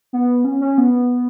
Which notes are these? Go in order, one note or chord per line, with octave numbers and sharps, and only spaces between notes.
B3
C#4
C#4
B3